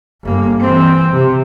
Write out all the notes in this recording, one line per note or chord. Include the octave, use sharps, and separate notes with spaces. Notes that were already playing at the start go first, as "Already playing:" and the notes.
G1 A#3
E3 C4
C3